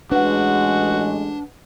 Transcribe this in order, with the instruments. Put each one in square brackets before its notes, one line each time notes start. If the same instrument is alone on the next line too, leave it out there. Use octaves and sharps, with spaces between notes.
[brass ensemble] A1 G#3 [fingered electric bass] D4 [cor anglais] F#4 [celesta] B4 F#5